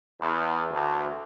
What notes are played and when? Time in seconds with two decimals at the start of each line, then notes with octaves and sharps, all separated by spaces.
0.20 E2
0.71 D2